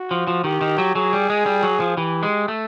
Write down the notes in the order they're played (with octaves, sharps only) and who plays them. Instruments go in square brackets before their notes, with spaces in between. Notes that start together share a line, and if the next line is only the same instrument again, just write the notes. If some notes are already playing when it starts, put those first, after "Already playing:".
Already playing: [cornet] F#4
[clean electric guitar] F3
F3
[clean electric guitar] D#3 [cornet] G4
[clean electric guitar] D#3
F#3
[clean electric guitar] F#3 [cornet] G#4
[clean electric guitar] G3
G#3
G3
F#3
F3
[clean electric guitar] E3 [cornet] G4
[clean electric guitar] G#3
A3